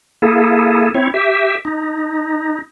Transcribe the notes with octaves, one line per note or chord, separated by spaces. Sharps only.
A#3 E4 G#4 A4
C4 E4 C#5
G4 E5
D#4